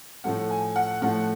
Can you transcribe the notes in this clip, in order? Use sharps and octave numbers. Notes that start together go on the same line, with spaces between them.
A2 F3 A3 F#5
G#5
F#5
A2 F3 A3 F#5